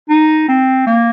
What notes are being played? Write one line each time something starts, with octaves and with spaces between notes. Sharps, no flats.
D#4
C4
A#3